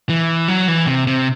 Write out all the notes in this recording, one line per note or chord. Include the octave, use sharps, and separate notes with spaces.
E3
F#3
E3
C3
C3